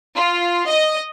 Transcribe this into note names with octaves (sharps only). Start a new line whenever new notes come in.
F4
D#5